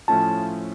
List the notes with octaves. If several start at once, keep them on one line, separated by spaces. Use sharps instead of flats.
A2 F3 A3 C#4 F4 A5